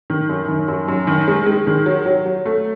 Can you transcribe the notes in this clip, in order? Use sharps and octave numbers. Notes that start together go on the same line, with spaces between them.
D#3
F#2
D#3
F#2
F#2
D#3
G#3
G#3
D#3
F#3
F#3
F#3
A3